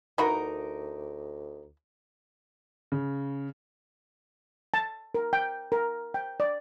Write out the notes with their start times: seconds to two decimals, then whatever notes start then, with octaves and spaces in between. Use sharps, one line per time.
0.18 D2 E3 D#4 F#4 A#4 B5
2.92 C#3
4.74 A5
5.15 A#4
5.33 G5
5.72 A#4
6.14 G5
6.40 D5